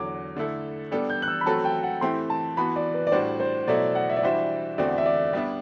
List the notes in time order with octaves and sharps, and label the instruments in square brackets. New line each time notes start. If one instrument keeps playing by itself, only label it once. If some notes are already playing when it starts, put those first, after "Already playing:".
Already playing: [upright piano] E2 D3 F#3 [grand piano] D6
[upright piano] D3 A3 E4 A4
G3 B3 D4 A4
[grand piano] G6
F#6
E6
B5
[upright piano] F#3 A3 C4 F#4 A4 [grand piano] A5
[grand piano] G5
F#5
[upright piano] E3 A3 C4 E4 G4 [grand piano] C6
[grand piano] A5
[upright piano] E3 B3 F#4 [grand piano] B5
[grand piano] D5
B4
D5
[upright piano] A2 G3 D4 F#4 [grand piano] C5
[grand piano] C5
[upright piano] B2 F#3 A3 E4 A4 [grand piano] D5
[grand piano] F#5
E5
D5
[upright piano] E3 G3 D4 F#4 C5 [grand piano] E5
[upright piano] E2 D3 A3 C4 F#4 [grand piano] D5
[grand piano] E5
D5
[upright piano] G3 B3 D4 [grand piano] E5